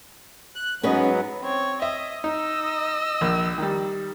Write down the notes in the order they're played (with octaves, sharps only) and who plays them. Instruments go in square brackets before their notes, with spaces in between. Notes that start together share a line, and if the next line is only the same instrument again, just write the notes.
[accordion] F#6
[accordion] G#2 F#3 B3 [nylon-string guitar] C#4 B4 D#5
[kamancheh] C4 C#5
[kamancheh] D#5 [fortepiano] E5
[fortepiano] D#4 [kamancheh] D#5 E6
[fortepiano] A#1
D#3 G3